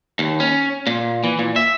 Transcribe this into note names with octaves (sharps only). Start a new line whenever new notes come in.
D#2
C#4
A#2
E3
A#2
E5